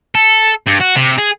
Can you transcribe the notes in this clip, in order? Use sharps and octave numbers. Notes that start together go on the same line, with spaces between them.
A4
G2
F#4
C3
G#4